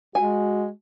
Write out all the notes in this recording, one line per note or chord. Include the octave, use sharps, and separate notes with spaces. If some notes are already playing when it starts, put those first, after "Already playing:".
G#3 F#4 G#5